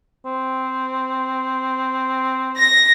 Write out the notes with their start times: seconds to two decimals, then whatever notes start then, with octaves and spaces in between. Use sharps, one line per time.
0.25 C4
2.58 A#6